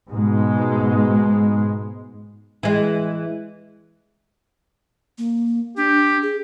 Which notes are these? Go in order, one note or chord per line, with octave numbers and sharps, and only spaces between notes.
G#2 B2 G#3
E3 G#3
A#3
D4 G4
G#4